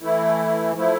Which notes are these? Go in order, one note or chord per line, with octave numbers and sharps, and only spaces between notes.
E3 A3 E4
F3 A3 E4